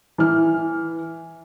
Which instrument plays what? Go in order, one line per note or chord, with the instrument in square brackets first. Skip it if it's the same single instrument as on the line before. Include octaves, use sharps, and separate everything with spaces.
[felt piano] E3 F6